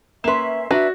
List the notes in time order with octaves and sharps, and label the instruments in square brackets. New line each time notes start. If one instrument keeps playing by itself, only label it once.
[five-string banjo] A#3 B4 [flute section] C#4 E5 [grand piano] C6 E7
[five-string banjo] D4 B4 A#5 [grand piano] F#4 [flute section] D5 E5